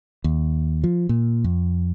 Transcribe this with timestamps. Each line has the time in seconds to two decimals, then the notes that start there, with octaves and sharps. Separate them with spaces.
0.24 D#2
0.84 F3
1.09 A#2
1.44 F2